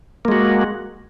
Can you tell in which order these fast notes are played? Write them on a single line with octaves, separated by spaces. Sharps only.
A#3 G#3 F#4